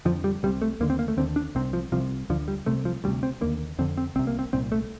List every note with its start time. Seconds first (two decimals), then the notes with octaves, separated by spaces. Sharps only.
0.05 F2 D3 F3
0.24 G3
0.43 C2 C3 G3
0.62 A3
0.80 D#2 D3 A#3
0.90 C4
0.99 A#3
1.08 A3
1.17 D#2 D3 C4
1.36 D4
1.55 C2 C3 C4
1.73 F3
1.92 C2 C3 F3
2.30 D2 D3 F3
2.48 G3
2.66 C2 C3 A3
2.85 F3
3.04 D2 G3
3.08 C3
3.23 C4
3.41 D#2 D3 A#3
3.79 F2 D3 C4
3.97 C4
4.16 C2 C3 C4
4.27 A#3
4.39 C4
4.53 C2 A#2 C4
4.72 A3